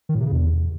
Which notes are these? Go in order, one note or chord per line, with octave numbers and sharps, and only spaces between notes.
D#3
A2
C3
C#3
E2